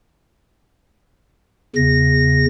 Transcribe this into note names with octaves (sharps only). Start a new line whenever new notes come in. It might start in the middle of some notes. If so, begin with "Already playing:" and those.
E2 C#3 A#6